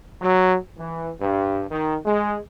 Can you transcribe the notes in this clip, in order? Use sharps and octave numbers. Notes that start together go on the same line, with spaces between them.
F#3
E3
G2
D#3
G#3